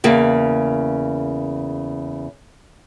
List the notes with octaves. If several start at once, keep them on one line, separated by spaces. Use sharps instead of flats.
E2 C#3 A#3